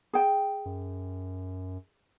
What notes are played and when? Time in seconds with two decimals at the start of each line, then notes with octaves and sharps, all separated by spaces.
0.13 G#4 G5
0.65 F#2